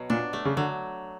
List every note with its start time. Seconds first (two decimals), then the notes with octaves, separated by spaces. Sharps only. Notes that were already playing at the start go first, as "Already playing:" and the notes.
Already playing: B2 F#3
0.10 A#2 D4
0.33 A3
0.45 C#3
0.57 D3 F#3